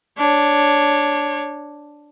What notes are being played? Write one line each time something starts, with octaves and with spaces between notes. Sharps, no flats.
D4 C#5